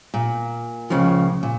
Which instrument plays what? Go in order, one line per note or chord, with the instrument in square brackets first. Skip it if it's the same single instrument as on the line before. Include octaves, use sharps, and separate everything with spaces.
[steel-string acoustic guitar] A#2
[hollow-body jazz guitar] C#2 C#3 F3
[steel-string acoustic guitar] A#2